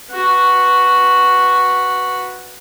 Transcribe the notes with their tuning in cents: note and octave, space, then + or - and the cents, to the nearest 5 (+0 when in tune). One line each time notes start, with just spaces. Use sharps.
F#4 +0 B4 +0